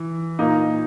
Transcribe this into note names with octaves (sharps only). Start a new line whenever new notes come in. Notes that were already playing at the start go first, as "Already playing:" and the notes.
Already playing: E3
A#2 A#3 D#4